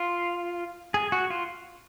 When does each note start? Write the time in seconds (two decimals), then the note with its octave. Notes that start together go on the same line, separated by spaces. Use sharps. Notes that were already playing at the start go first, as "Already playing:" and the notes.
Already playing: F4
0.94 G#4
1.12 F#4
1.30 F4